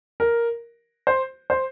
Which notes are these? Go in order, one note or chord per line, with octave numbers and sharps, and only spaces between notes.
A#4
C5
C5